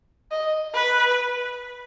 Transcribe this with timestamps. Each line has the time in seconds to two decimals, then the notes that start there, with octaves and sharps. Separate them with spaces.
0.31 D#5
0.75 B4